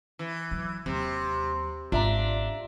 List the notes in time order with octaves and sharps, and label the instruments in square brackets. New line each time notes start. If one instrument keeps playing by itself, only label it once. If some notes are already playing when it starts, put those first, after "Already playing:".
[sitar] E3
[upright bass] F#3
[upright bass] D#2 F#3 [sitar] C3
[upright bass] G#1 [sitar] D4 [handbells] F4 E5 A#5